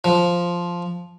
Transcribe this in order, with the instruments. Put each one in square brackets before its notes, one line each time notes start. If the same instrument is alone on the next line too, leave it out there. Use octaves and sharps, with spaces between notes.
[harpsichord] F3